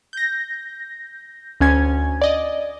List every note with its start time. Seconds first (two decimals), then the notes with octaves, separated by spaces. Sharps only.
0.13 G6 A#6
1.61 D2 C#4 G#5 G#6
2.22 D5 D#5